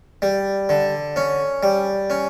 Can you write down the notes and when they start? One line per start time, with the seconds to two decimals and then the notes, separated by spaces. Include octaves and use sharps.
0.22 G3
0.69 D3
1.16 C#4
1.63 G3
2.10 C#4